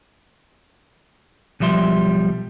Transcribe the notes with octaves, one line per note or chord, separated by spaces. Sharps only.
B1 F3 G3 E5 C6